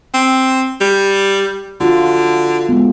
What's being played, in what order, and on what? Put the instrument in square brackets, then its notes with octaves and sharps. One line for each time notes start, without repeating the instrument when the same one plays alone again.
[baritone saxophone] C4
G3
[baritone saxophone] D3 [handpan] F4 F#4
[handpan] G#3 B3